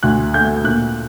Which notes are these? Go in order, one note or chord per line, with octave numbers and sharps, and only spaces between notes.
D2 F#6
A3 G6
A#2 F#6